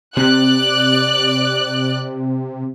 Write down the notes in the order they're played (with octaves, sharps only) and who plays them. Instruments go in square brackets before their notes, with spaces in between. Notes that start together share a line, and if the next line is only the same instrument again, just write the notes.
[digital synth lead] C3 [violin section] D5 F#6